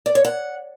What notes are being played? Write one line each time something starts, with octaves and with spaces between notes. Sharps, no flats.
D5
C#5
F#5